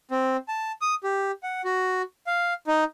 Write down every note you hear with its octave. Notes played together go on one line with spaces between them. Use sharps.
C4
A5
D#6
G4
F#5
F#4
F5
D#4